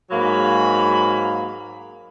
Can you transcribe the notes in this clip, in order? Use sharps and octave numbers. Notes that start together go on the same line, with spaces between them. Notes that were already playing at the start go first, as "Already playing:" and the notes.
G#2 F#3 A#3 B5